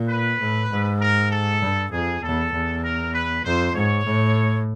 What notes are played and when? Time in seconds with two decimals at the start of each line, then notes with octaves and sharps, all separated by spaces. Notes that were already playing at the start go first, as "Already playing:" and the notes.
Already playing: A#2
0.09 B4
0.39 A2
0.70 G#2
1.01 A#4
1.31 A4
1.61 G2
1.92 F2 G#4
2.23 E2 A4
2.53 E2
2.84 A#4
3.14 B4
3.45 F2 C5
3.75 G#2 C#5
4.05 A2